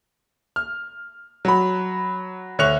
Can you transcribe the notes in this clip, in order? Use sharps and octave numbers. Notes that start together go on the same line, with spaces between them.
F6
F#3 B5
D2 C#5 C#6 F#6 F7